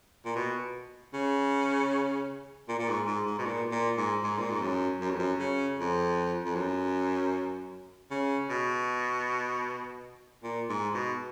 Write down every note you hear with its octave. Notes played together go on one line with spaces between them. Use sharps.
A#2
B2
C#3
A#2
A#2
G#2
G#2
G#2
B2
A#2
A#2
G#2
G#2
A#2
G#2
F#2
F#2
F2
F#2
C#3
F2
F2
F#2
C#3
B2
A#2
G#2
B2